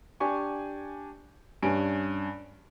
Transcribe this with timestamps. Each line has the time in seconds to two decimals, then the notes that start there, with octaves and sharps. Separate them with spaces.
0.20 D4 G4 G#5 C#6
1.62 G2 C#4 G#5 D7